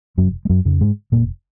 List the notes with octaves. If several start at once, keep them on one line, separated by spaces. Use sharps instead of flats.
F1 F#2 F#3
G#3
F#2 F#3
F2 C#3
G#2 G#3
F1 A#2 A#3